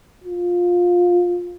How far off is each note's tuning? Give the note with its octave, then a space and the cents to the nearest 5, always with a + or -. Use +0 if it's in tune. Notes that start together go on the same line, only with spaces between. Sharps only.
F4 +15